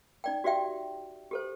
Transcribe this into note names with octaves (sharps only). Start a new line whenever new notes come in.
D#4 D5 G5
F#4 G4 D5 E5 G5
G4 A4 C5